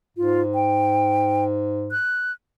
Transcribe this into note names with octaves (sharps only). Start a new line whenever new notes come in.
G#2 F4
G5
F#6